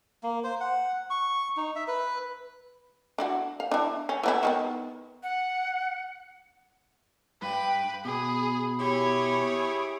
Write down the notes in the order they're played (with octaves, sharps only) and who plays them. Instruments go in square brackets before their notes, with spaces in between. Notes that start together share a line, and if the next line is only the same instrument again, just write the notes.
[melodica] A#3
C5
F#5
C#6
D#4
E5
B4
[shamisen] D4 E4 F#4
F5
D4 E4
C#4
E3 B3 E4
D#3 G#3 B3
[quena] F#5
[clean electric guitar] G2 [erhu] B4 [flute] G5
[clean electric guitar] B2 [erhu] G#4 [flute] B5
[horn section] E4 G4 G#4 [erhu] C#5